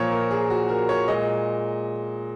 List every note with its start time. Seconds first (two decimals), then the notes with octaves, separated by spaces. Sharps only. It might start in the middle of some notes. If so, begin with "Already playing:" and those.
Already playing: A#2 F3 A#3 C#5
0.11 A#4
0.31 G#4
0.50 F#4
0.69 A#4
0.89 C#5
1.08 A#2 G#3 D#5